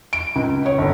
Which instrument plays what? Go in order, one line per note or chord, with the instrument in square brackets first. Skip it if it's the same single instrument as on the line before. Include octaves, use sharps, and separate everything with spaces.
[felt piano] D7
C#2
C#5
G1